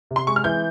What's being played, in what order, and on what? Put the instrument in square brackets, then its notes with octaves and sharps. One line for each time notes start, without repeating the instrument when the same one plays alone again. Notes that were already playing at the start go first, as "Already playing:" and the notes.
[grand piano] C3
[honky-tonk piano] C6
[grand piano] G#3 [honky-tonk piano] C#6
[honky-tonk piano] F6
[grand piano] E3 [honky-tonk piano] G6